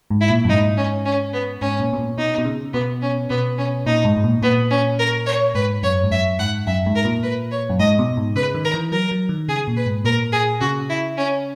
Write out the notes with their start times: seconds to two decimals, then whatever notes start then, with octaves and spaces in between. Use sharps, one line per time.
0.10 G#2
0.20 E4
0.30 A#2
0.45 F#2
0.48 G#2 D#4
0.77 C#4
1.05 C#4
1.33 B3
1.61 G#2 C#4
1.80 A#2
1.93 B2
1.99 A#2
2.17 B2 D#4
2.38 B2
2.45 C#3
2.73 B2 B3
3.02 C#4
3.30 B2 B3
3.58 C#4
3.86 A#2 D#4
4.05 G#2
4.17 G#2
4.24 A#2
4.42 A#2 B3
4.70 C#4
4.99 A#4
5.26 C#5
5.55 G#2 B4
5.83 F#2 C#5
6.04 G#2
6.11 F#2 E5
6.39 G#2 F#5
6.67 F#2 E5
6.86 G#2
6.96 A#4
7.05 A#2
7.23 B4
7.51 C#5
7.69 F#2
7.79 G#2 D#5
7.99 B2
8.17 G#2
8.35 C#3 B4
8.54 D#3
8.64 A#4
8.74 E3
8.92 F#3 A#4
9.11 F#3
9.29 D#3
9.48 C#3 G#4
9.67 A#2
9.76 B4
9.86 G#2
10.04 A#2 A#4
10.32 G#4
10.60 C#3 F#4
10.89 E4
11.17 C#4